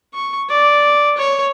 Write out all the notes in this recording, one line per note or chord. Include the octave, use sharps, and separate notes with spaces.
C#6
D5
C#5